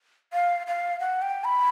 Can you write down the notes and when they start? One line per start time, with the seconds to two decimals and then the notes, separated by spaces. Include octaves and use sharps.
0.33 F5
0.67 F5
1.00 F#5
1.22 G5
1.44 B5